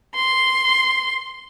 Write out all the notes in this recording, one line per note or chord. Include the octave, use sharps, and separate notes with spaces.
C6